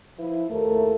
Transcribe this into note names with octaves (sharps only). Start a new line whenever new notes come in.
F3 E4 B4
D#2 A3 A#4